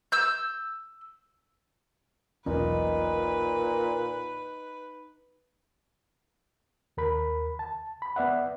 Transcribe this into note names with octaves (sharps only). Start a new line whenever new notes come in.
E6 G6
E1 B1 A#2 C#4 D#4 B4
D#2 A#4 B5
A5
B5
B3 D5 E5 F#5